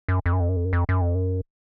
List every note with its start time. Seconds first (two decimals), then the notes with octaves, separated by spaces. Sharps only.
0.08 F#2
0.26 F2
0.33 F#2
0.40 F2
0.49 F#2
0.56 F2
0.65 F#2
0.73 F2
0.89 F#2
1.01 F2
1.15 F#2